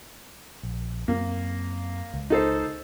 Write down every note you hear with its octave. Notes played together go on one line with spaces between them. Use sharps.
A#1
F#2 A#3 C4
C#2
D#4 A4 C5